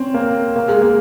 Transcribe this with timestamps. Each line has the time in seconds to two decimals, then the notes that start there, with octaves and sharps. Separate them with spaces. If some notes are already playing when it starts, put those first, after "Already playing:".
Already playing: C4 C#4
0.14 A#3
0.56 A#3
0.68 G#3
0.82 A#3